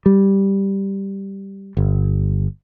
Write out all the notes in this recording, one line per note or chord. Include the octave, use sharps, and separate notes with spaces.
G3
G1